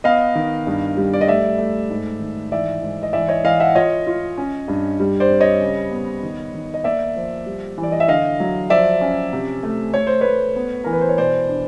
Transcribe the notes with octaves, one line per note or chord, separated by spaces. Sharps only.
B3 D#5 F5
D#3
G2
G3
D5
D#5
A3 D5 E5
A3
G#2
D#3
E3 D5 E5
G#2
D#5
E3 D5 E5
C#5 D#5
E3 D#5 F5
E5 F#5
F4 C#5 D#5
F4
C#4
G2
G3
C5 D5
C4
C#5 D#5
C#3
B3
D#3
D#3
D#5
A#3 D5 E5
F3
G3
E3
D5
D#5
E5
D3 D#5 F5
F#3
F3 D5 E5
C#4
C3
A3
A3 C#5
C5
A3 B4 C#5
B3
E3 A#4
B4
C5
C#5
B2 C5 D5
D4